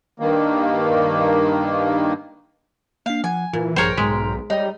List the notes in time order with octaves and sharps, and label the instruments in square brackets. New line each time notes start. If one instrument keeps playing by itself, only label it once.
[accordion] G2 D#3 A#3
[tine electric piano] A#3 D4 [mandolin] F5
[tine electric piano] F3 F#5 [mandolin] G#5
[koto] A#2 [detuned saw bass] E3 [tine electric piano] F4
[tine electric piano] A#1 F3 G#4 [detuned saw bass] G2 [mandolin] A#4 G5 [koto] C5 C#5
[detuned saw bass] B1 [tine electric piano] G#2 C6 B6 [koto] G#3
[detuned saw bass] G3 [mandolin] D#4 [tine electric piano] C#5 D5 G5